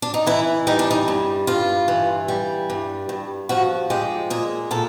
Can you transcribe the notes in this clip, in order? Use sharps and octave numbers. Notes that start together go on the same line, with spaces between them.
D4
D#4
E3 E4
G3 D#4
D4
D#4
G2
G2 F4
E3
G3
G2
G2
F3 F#4
G#3 G4
A#2 G#4
A#2 A4